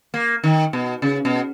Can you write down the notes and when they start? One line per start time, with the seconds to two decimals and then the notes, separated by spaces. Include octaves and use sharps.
0.14 A#3
0.44 D#3
0.73 B2
1.02 C#3
1.25 B2